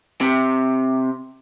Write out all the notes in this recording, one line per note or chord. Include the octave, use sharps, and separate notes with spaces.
C3